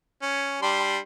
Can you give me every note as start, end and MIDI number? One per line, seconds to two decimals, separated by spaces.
0.22 0.58 61
0.62 0.98 55
0.62 0.98 62
0.62 0.98 84